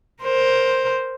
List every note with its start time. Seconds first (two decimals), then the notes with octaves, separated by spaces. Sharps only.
0.23 A#4 C5